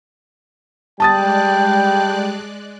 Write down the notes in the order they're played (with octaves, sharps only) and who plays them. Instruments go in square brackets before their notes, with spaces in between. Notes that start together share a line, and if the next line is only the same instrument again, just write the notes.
[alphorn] G3 [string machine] G#3 D5 F#6 [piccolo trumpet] G5 [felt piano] A5 D#6 A6